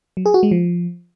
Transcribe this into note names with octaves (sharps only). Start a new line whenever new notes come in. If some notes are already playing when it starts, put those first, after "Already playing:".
F#3
G#4
F#4
G#3
F3